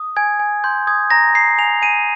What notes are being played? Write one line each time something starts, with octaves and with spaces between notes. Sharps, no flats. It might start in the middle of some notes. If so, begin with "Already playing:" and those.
Already playing: D#6
G#5 G#6
G#5
C6 G6
D#6 G#6
A#5 A#6
A#5 C7
G#5 F7
G#5 D#7